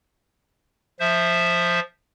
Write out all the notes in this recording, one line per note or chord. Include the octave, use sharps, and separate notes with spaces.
F3 C5 E5